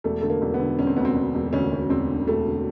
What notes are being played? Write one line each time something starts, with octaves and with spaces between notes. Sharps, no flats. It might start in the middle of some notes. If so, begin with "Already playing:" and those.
E1 A3
D3 A3
A#3
E1
B3
D3
E1 C#4
C4
D2 B3
C4
D2
E1
D2 C#4
D2
E1 C4
D3
E1 A3
D3